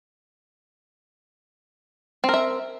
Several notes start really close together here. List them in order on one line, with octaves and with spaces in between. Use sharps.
C4 A#4 E5